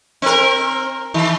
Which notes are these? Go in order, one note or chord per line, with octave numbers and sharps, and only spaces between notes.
C4 A#4
D#3